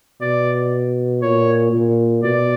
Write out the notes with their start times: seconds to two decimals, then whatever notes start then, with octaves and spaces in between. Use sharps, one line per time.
0.21 B2 D5
1.22 A#2 C#5
1.73 A#2
2.24 B2 D5